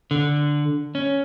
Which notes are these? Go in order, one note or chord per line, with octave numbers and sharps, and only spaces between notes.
D3
C#4